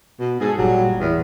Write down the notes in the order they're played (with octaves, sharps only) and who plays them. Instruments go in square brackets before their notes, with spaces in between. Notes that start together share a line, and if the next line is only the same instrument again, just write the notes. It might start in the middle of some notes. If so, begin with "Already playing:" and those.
[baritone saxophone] B2
[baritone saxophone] G#2 [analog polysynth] G#4 A4
[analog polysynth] G1 A#2 G3 [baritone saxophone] F#3
[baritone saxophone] E2 [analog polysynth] A2